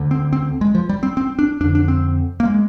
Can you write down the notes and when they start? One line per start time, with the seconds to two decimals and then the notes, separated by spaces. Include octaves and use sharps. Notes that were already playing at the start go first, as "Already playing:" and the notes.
Already playing: D2 D3
0.11 C4
0.33 C4
0.61 G#3
0.75 F3
0.89 G3
1.03 C4
1.17 C4
1.39 D4
1.61 F2 D4
1.64 D3
1.75 D4
1.88 C4
2.40 A#3
2.45 G#3